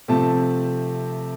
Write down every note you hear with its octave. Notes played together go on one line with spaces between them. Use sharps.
C3 F3 A3 C4 A5